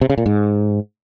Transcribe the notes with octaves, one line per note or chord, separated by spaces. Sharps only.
C3
C#3
A#2
G#2